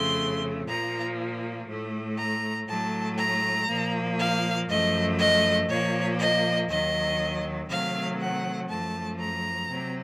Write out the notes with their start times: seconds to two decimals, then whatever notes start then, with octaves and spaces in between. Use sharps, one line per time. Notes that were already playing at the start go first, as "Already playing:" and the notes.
Already playing: F2 C#3 A3 C6
0.66 A#2 F3 A#3 A#5
1.67 A2 A3
2.17 A#5
2.67 A2 F#3 A3 A5
3.17 A#5
3.67 A#2 F3 A#3
4.17 F5
4.68 F#2 F3 A3 D#5
5.18 D#5
5.68 A#2 F3 A#3 C#5
6.19 D#5
6.69 D#2 D#3 F#3 D#5
7.68 C3 D#3 F#3 A3 F5
8.20 F#5
8.69 F#2 F3 A3 A5
9.19 A#5
9.69 C3 F#3